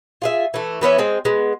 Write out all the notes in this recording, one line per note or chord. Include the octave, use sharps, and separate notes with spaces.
F4 G#4 E5
E3 A3
E3 B3 C#4 E5
G#3 C4 G#4
G#3 B3